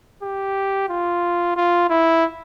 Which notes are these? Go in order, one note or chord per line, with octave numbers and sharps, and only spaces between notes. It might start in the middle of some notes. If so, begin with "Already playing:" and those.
G4
F4
F4
E4